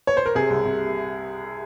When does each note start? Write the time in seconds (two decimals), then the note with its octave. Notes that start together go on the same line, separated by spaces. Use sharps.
0.07 C#5
0.17 C5
0.26 A#4
0.35 C3 G#4
0.50 C2
0.65 C3